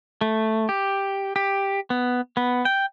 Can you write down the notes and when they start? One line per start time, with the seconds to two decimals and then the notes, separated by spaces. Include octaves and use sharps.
0.21 A3
0.69 G4
1.36 G4
1.90 B3
2.37 B3
2.65 G5